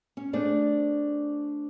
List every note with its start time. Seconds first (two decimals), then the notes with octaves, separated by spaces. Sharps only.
0.17 C#4
0.33 A3 C4 D4 G#4 C5 D5